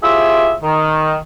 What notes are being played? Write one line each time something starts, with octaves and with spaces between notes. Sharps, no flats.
E4 F4 G4 G#4 C5 E5
D#3